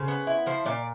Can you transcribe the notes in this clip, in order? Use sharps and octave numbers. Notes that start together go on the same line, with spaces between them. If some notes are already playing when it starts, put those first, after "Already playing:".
Already playing: C#3 C5
B3
E4
F3 C5
A#2 D5